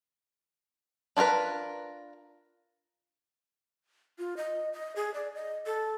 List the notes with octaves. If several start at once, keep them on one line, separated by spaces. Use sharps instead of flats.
D4 F4 G#4 A#4 B4
F4
D#5
D#5
G#4
D5
D#5
A4